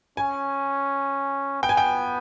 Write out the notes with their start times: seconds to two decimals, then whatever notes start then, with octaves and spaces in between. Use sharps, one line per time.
0.17 C#4 G#5
1.62 B3 G5
1.69 G#5
1.77 G5